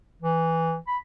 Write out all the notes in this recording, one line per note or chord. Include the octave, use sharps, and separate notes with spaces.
E3
B5